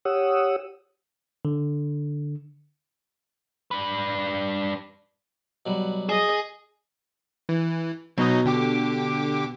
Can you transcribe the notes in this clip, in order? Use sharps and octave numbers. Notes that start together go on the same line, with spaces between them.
G4 C#5 F#5 D#6 E6
D3
D4 B4
B2 F#3 G3
G#4 D#5
E3
B2 F#3 D#4 D#5
D3 G4 D6